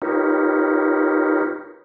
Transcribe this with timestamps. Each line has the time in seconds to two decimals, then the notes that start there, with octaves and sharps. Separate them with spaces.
0.02 D#4 F4 G4 A#4 B4 C#5